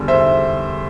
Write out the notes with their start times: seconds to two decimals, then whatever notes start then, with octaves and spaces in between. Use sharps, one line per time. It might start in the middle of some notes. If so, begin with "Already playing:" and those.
Already playing: E2 D3 G3
0.08 C5 E5